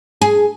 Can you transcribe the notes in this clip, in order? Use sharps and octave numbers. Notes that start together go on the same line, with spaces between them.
G#4